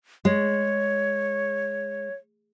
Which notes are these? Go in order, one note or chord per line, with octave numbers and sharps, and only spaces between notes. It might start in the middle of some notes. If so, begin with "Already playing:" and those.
G#3 C#5